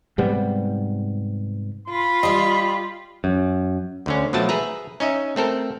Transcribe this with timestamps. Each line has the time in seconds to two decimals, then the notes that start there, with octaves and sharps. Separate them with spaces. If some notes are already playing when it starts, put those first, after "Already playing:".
0.18 G#2 C3 G3 B3
1.88 F4 B5
2.23 G3 G4 D#5
3.24 F#2
4.06 D2 D3 C#4
4.33 B2 F3 F#3 A3 A5
4.49 G#4 B4 E5 A#5
5.00 C#4 D#4 D#5 E5
5.36 A3 C4 A4 A#4